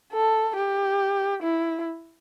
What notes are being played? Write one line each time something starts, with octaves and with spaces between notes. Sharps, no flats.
A4
G4
E4